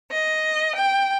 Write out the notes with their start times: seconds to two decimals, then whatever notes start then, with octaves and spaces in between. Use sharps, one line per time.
0.10 D#5
0.75 G5